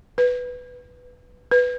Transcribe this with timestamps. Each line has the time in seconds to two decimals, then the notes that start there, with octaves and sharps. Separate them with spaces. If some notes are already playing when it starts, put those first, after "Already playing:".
0.18 B4
1.51 B4